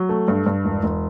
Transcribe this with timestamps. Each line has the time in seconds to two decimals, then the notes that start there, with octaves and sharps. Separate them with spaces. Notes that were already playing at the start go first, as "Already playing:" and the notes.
Already playing: F#3
0.09 A3
0.28 G2
0.46 G2
0.65 E1
0.83 E1